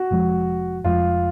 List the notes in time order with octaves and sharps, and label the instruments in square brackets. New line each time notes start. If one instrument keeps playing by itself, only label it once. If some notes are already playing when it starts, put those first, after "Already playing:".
Already playing: [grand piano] F#4
[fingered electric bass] F1 F2 F3 G#3
[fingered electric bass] F1 F2 F3 G#3 [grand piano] F4